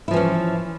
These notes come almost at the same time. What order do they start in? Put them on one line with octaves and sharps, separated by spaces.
E4 F3 E3 C#4